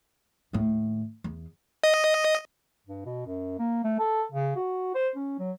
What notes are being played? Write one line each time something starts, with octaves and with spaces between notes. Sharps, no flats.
D#2 A2
E2
D#5
G2
B2
F#2
A#3
A3
A4
C#3
F#4
C5
C#4
F#3